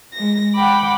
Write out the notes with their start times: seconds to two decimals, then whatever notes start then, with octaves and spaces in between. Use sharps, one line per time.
0.14 G#3 A#6
0.56 F#5 G5 B5 D6